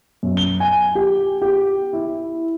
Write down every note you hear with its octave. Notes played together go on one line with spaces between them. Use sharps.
F#2
G7
G#5
G4
G4
E4